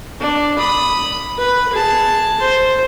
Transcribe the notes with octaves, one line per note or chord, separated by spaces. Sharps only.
D4
B5 D#6
B4
G#4 A5
C5